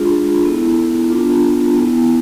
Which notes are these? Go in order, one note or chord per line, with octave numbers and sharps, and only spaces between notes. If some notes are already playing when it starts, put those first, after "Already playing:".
Already playing: G#3 D4 F4 G#4
B3 E4 A4
B3 D4 F4
B3 E4